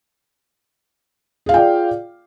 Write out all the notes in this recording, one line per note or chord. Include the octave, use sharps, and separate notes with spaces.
F4 G#4 D5 F5 G5